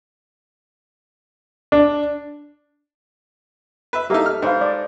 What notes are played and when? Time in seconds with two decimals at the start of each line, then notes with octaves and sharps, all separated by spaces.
1.72 D4
3.93 B4 E5
4.10 A#3 D#4 G4 A4 E5
4.26 F6
4.42 G#2 B4 C5 F5
4.61 D5